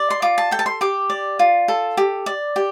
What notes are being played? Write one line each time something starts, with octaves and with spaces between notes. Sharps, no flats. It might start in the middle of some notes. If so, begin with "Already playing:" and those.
Already playing: D5
C6
F4 D6
A5
A4 G5
A5
C6
G4 D6
D5
F4
A4
G4
D5
G4